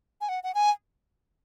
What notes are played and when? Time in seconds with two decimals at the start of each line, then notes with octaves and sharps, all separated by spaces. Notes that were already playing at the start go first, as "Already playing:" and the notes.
0.21 G#5
0.29 F#5
0.43 F#5
0.55 G#5